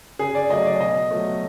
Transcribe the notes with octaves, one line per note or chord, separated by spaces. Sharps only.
C#3 G#4
D5
F#3 A3 D#5
D5
B2 D#5
F#3 A3